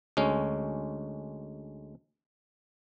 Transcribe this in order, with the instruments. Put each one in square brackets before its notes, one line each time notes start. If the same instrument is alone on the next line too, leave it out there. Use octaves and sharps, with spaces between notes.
[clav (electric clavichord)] D2 G#3 C#4